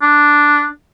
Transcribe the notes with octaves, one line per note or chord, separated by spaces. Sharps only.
D4